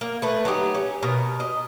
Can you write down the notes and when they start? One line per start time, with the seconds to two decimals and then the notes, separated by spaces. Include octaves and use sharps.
0.01 A#3
0.22 A3 B4
0.45 F#3 D#4 G4
0.75 C#4
1.03 B2 A#4
1.40 D#5